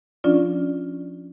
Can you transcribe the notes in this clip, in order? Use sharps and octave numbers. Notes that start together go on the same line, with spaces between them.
F3 C#4 D4 F4 D5